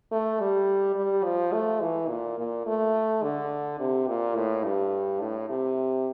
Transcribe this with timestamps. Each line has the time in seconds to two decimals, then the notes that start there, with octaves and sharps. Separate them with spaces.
0.12 A3
0.40 G3
0.96 G3
1.24 F3
1.53 A3
1.81 E3
2.09 A#2
2.38 A#2
2.67 A3
3.23 D3
3.80 C3
4.07 A#2
4.36 A2
4.64 G2
5.21 A2
5.49 C3